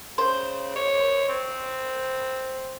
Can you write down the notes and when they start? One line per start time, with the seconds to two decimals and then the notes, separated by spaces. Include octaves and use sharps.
0.18 C#3 C5
0.76 C#5
1.29 C4